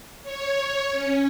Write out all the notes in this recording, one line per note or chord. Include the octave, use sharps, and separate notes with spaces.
C#5
C#4